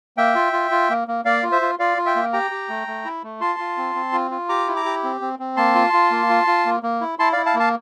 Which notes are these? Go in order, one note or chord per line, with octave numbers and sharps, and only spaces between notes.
A#3 E5 G5
F4
F4
F4
A#3
A#3
A#3 D5 F5
F4
C5 E5
F4
F4 D5 F5
F4
E5 G5
A#3
G4 G5 A#5
G4
A3
A3
E4
A3
F4 A5 C6
F4
C4
C4
F4
F4
G4 A#5 D6
E4
A#5 D6
G4
C4
C4
C4
A#3 A5 C6
F4
F4
A#3
F4
F4
A#3
A#3
E4
E4 A5 C6
E4 D5 F5
F5 A5
A#3
F5 A5